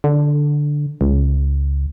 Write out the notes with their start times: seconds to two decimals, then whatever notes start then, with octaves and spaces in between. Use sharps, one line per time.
0.04 D3
1.01 C#2